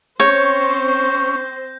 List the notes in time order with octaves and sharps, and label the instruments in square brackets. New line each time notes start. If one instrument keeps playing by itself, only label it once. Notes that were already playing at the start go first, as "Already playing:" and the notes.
[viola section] C4 C5 [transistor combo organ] C#4 [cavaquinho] C#5 [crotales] G6 A#6